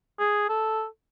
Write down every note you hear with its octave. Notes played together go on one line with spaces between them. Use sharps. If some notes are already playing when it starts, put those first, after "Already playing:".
G#4
A4